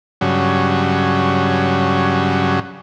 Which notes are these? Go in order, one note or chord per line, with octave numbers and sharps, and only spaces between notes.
G2 C#3 F#3